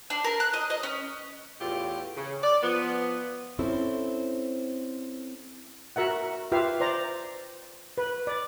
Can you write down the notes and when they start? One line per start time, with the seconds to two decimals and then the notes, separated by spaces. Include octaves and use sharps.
0.10 D4
0.24 A#4
0.40 F#6
0.53 D#5
0.70 D#5
0.83 C#4
1.61 E2 A2 F4 G4
2.16 C#3
2.43 D5
2.63 F3 B3
3.59 C4 C#4 E4 A4
5.96 F#4 A#4 E5 F#5
6.52 F4 G4 B4 E5 F5
6.80 C5 D5 A#5
7.98 B4
8.27 D5